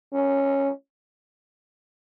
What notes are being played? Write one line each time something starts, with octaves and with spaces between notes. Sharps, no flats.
C#4